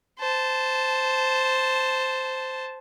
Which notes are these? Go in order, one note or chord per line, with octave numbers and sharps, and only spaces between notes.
C5 A5